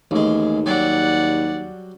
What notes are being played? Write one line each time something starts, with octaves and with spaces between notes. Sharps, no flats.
A1 D#2 G#3
F#3 G3 D5 F#5